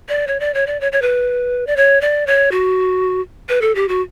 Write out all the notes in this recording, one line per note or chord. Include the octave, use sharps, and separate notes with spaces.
D5
C#5
D5
C#5
D5
C#5
C#5
B4
D5
C#5
D5
C#5
F#4
B4
A4
G4
F#4